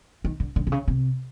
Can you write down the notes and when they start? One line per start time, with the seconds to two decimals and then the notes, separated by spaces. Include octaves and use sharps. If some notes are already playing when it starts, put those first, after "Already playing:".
0.24 D#3
0.40 D3
0.56 D3
0.67 C3
0.72 C#3
0.88 C3